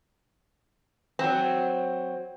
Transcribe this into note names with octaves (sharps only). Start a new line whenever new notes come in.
F#3 C4